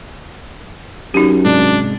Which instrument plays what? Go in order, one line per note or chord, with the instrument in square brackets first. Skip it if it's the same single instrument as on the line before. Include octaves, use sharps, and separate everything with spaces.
[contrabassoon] F#2 [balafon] D#4 G4
[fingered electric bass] G#2 C3 G#3 [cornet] D4